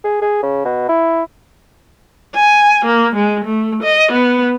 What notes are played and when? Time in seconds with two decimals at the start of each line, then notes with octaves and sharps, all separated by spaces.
0.04 G#4
0.22 G#4
0.43 C#3
0.65 B2
0.89 E4
2.35 G#5
2.86 A#3
3.16 G#3
3.45 A3
3.83 D#5
4.12 B3